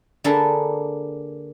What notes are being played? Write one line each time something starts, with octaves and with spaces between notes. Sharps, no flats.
D3 A#3 D4 G#4 A4 B4